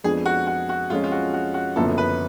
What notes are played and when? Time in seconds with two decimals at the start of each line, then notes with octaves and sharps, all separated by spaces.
0.04 F2 F3 G#3 B3 D4 G#4
0.26 F#4
0.47 F#4
0.69 F#4
0.90 F2 F3 G#3 C#4 F4
1.04 F4
1.12 F#4
1.34 F#4
1.54 F#4
1.76 F#1 F#2 D3 F3 B3 A4
1.98 B4